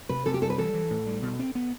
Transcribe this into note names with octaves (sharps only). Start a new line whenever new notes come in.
C3 B4
C3 A4
G4
G3 A4
B4
E3 A4
E3
A2
G3
B2
C4
B3